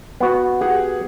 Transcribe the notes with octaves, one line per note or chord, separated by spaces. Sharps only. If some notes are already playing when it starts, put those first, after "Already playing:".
B3 F#4
G4 G#4 F#5